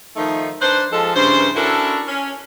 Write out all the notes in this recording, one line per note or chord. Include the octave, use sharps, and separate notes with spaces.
D#3 F3 A3 D#4
D4 D#4 B4 C5
F3 G#3 A4
G2 C#3 E3 C5
C#4 D4 E4 F#4 A4 A#4
C#4